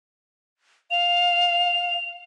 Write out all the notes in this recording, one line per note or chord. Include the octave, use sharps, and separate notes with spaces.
F5 F7